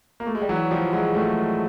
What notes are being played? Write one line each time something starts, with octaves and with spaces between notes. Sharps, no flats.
A#3
A3
G#3
G3
E3 F#3
F3 G3
F#3 G#3
G3 A3